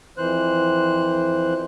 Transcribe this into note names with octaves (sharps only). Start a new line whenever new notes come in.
F2 E3 C5 F#6